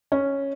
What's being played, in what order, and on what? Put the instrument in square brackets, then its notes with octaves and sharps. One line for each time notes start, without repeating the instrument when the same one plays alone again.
[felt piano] C#4